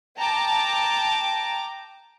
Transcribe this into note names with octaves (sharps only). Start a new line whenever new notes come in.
G5 A5 A#5 D6